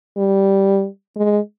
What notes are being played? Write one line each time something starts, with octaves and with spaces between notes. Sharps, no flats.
G3
G#3